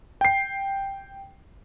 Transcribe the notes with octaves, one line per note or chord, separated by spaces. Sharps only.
G5 C7